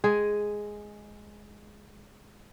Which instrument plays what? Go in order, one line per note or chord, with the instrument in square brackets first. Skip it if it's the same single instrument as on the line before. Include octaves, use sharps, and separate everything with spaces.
[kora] G#3 G#4